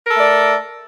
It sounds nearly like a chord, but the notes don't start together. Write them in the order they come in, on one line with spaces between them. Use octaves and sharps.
A#4 A4 A3 D5